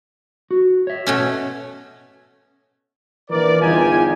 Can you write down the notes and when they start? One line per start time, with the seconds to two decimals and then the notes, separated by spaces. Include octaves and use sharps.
0.51 F#4
0.87 C#5 E5
1.07 B2 A3 C#4
3.30 A#1 E3 A#4 B4 D5
3.62 G1 E2 D#4 F4 G4 G#5